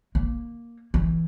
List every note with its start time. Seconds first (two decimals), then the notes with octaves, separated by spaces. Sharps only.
0.15 A#3
0.94 E3